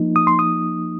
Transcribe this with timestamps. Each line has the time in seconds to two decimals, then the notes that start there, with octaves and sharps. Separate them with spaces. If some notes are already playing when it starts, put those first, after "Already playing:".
Already playing: F3 A#3 D#4
0.16 D#6
0.27 C6
0.39 D#6